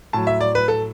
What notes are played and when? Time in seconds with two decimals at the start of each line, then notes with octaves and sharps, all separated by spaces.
0.13 A2 F#3 A5
0.27 E5
0.41 D5
0.55 B4
0.68 A4